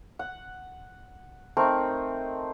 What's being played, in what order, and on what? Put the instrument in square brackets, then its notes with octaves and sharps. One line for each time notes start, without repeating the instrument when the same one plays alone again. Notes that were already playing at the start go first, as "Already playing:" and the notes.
[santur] F#5
A3 C4 D#4 A#4